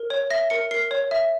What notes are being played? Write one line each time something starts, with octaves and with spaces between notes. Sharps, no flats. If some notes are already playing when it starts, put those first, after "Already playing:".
Already playing: A#4
C#5
E5 A#6
A#4 C#7
A#4 C7
C#5
E5